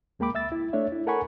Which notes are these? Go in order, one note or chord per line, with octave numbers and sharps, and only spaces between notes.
D#2 G#3 A#3 G5 B5 D6
C#2 E5 E6 A6
E4
A3 D4 C#5 E5
E4
A4 A#4 F#5 G#5 B5 C#6